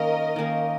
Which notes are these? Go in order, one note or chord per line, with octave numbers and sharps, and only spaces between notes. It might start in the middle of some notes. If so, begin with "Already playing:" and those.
Already playing: D#3 A#3 C#4 A#4 D#5
D#3 A#3 C#4